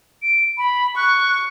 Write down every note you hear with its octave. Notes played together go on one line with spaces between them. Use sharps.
D7
B5
C#6 F#6